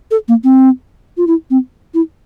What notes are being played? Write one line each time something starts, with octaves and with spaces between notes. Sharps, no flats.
A4
A#3
C4
F4
E4
C4
E4